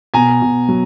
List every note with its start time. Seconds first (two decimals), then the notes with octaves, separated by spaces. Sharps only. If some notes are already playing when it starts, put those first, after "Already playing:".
0.14 B2 G#5 A#5
0.42 B2
0.69 F#3